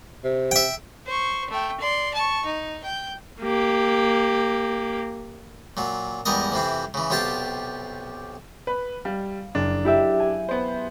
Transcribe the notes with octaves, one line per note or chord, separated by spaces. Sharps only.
C3
E5 G5
C5 C#6
A3 G5
D5 C6
A5 C#6
D#4
G5 G6
A#3 G4
A#2 F#3
E2 G3 G#3 A#4 D#5
F2 C3 E3 C4
C#3 E3
B1 C3 F4 G4 A5
B4
G3 F5
F#1 D4
E4 G4 E5
G#5
B3 C5